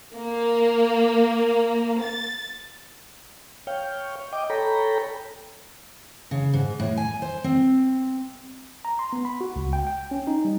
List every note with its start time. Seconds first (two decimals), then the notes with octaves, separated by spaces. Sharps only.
0.16 A#3
2.03 A6
3.67 C#5 F5 G5
4.33 D#5 G5 D6
4.50 A4 C#5 G5 A#5 B5
6.31 C#3
6.53 G#2
6.80 A2
6.97 G#5
7.22 C5
7.44 C4
8.85 A#5
8.99 C6
9.13 B3
9.25 B5
9.41 F#4
9.56 C#2
9.73 G5
9.87 G5
10.11 C#4
10.27 D#4
10.45 G3